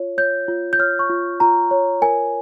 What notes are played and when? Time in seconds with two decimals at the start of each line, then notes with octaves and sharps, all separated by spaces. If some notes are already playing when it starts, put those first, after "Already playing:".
Already playing: F4 C#5
0.17 C#5 G6
0.48 F4
0.73 G6
0.79 C#5 F6
0.99 C#6
1.09 F4
1.40 F4 A#5
1.71 C#5
2.02 A#4 G#5